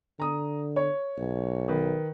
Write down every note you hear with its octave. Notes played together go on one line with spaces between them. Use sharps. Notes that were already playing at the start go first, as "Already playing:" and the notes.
D3 A#5 D#6
C#5
B1
D#3 B4